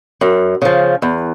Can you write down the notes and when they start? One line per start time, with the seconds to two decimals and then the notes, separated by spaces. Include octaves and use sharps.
0.21 F#2
0.62 C#3 F3
1.02 E2